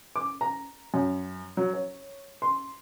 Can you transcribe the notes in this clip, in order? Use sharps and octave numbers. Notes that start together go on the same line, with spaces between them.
D6
A#5
F#2
F#3
C#5
C6